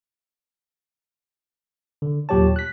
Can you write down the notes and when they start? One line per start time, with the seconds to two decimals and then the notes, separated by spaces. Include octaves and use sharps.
2.02 D3
2.29 D#2 A#2 F#3 G4 C#5 A5
2.56 F#6 B6